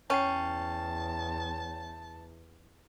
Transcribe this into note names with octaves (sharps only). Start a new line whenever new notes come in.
E2 C#4 C#5 G5 A5 C7